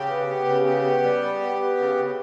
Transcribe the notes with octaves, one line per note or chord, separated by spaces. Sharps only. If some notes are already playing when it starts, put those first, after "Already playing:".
Already playing: C#3 G4
B3
B3
C#3
B3 G4
B3
G3
B3
B3
B3
C#3
C#3